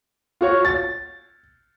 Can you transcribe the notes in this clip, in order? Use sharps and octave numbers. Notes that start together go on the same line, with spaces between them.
F4 F#4 C#5
A6